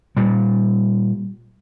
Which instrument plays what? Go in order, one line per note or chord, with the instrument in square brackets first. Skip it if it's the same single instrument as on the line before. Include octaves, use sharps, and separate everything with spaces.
[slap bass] A#2 G3